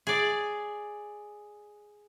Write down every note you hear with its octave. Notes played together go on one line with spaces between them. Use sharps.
G#4 D5